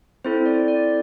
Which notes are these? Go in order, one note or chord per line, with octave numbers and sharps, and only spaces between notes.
C4 E4 A4 C5
D5
D5